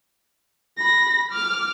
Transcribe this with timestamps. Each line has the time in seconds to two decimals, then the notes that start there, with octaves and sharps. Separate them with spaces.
0.77 B5 A#6
1.32 D6 F6